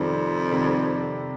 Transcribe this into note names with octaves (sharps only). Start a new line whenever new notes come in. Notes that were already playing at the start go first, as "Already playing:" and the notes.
Already playing: F2 C3 D#3 G3
C3 D#3 G3